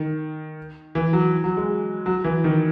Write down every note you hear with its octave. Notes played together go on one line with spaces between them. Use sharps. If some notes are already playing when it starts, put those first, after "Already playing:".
Already playing: D#3
E3
F#3
F#3
G#3
F#3
E3
D#3